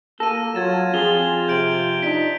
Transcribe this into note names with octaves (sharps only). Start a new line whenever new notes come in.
A#3 A4 A#6 D#7
F#3 F4 G#6 A6 E7
F2 G#4 F7 G7
C3 G6 D7 F#7
D4 D#4 B6 D7